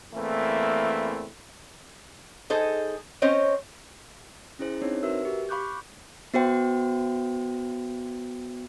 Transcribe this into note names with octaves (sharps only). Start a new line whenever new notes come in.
E2 E3 A3 A#3 C4 E4
D#4 G#4 A4 C5 D#5
C4 C#4 C5 C#5 D#5
C#4 E4 G#4 C5
C4 D4 D#4 C5 C#5
F#4 A#4 B4 E5 E6
G4
F5 B5 C#6 D6 F#6 G6
B3 F#4 C5 G5